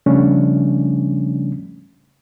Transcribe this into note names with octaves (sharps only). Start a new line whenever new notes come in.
C#3 F3 G3 A3 C#4 D4